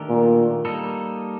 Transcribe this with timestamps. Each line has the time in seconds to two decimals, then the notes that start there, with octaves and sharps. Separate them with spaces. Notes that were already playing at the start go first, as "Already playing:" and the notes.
Already playing: D#3 A3 D4 G4 A#4
0.09 A#2
0.65 G3 A#3 D#4 A4